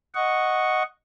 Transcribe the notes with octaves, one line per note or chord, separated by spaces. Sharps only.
D#5 F#5 C#6